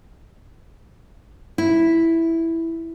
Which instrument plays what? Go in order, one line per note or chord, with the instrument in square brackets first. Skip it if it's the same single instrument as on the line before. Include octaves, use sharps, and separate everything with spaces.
[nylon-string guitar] E4